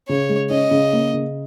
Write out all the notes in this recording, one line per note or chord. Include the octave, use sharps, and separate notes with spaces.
C#3 C#5
G#3
C#4 D#5
C#3
A#3
C#3